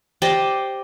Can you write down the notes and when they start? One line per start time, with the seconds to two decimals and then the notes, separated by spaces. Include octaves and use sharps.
0.22 G4 C5 D5 D#5